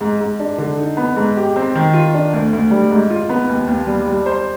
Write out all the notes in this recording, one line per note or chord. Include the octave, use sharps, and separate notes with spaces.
G#2
G#2
D4
D3
D#4
B3
G#2
G4
C4
D#3
F4
D4
D2
D2
G3
G#2
F4
B3
D#2
D#2
G3
G3
C5